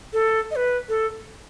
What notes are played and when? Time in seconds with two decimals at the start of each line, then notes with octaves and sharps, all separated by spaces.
0.13 A4
0.51 D#5
0.56 B4
0.89 A4